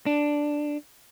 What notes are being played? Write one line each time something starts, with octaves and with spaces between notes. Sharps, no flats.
D4